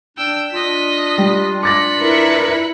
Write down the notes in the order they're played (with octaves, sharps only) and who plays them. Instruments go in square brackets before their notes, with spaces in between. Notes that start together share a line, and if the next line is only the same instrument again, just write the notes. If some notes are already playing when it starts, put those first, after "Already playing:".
[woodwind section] D4 [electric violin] G5 E6
[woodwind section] D4 F4 [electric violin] D#5 B6
[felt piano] G3
[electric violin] B5 C#7 [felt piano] D6 A6 A#6
[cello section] E4 A#4 B4